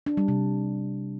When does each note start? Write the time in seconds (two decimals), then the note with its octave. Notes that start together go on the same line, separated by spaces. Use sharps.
0.06 D4
0.17 G3
0.28 C3